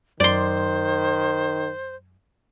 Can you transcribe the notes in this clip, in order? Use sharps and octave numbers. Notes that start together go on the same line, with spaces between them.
F#2 D#3 C5 D5 C6